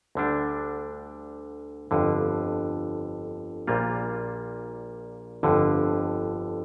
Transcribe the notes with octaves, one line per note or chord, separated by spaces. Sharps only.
D2 D3 G3 D4
G1 F2 D3
A#1 A#2 G3 A#3 F4
G1 F2 D3